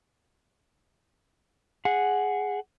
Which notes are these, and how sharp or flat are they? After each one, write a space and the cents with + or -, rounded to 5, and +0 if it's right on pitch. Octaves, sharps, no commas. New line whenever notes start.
G#4 +0 F#5 +0